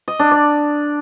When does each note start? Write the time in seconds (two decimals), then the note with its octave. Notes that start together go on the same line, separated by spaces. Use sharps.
0.08 D#5
0.19 D4
0.31 D5